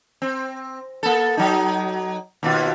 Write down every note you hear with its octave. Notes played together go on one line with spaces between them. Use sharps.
C4
A#3 A4
F#3 D#4
D#2 B2 F4